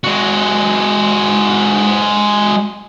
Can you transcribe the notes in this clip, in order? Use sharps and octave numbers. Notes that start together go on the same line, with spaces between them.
G#3 F#4